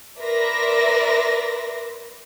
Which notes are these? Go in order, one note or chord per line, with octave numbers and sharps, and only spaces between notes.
A#4 B4 D5 E5 C6 A#6